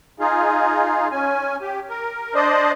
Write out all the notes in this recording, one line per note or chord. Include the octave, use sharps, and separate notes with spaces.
D#4 F4 G#4
C#4 G#5
G4
A#4
D4 C5 D5 D#5